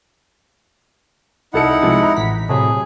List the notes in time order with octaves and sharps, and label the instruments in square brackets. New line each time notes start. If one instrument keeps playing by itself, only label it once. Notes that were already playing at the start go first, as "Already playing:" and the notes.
[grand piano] C2 A4 C#7 [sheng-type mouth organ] D#4 E4 F#5
[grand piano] C3 F3 G#3
A#5
[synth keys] A1 B6
[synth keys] A2 C3 F#3 [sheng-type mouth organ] G#4